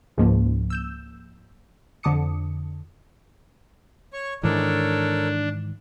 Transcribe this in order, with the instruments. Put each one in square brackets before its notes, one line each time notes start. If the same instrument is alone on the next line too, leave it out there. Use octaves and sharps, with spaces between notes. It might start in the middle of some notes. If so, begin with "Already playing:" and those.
[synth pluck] C#2 G#2 F3 A#3
E6 G6 E7
F2 D3 A5 D6 D#6 C#7
[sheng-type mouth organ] C#5 C#6
[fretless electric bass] G#2 D#3 E3 [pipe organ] D4 [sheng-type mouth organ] A4 A#4 C#5